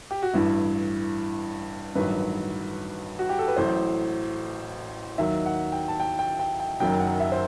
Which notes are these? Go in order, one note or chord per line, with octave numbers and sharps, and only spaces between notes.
G4
F#4
A1 G2 E3 E4
A1 G2 D#3 F#3 B4
F#4
G4
A4
B4
A1 A2 F#3 C5
D#2 D#3 F#3 E5
F#5
G5
A5
G5
G5
G5
G5
F#1 F#2 D#3 F#3 G5
F#5
E5
C5